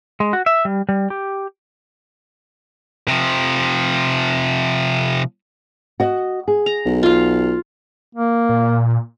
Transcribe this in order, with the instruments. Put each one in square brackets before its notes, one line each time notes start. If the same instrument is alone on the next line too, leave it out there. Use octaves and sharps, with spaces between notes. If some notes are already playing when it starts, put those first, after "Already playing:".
[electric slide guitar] G#3
F#4
E5
G3
G3
G4
[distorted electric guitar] C3 F3
[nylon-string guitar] F#4 D#5
G#4
[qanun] A#5
[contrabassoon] B1
[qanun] F4 F5
[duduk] A#3
[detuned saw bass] A#2